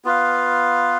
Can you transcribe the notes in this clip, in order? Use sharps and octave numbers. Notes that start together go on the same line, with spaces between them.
B3 F4 B4 F5